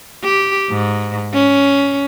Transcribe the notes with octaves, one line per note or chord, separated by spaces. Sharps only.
G4
G#2
C#4